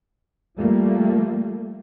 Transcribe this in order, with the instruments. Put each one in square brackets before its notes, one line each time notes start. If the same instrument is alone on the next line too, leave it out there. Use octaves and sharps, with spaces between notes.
[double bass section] F3 G3 A3 A#3